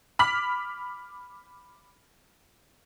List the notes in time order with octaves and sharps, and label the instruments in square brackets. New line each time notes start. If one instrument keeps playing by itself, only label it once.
[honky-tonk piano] B5 D6 F6 B6 F#7